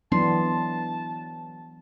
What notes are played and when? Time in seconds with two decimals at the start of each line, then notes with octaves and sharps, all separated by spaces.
0.12 E3 F#3 B3 D4 A5 C6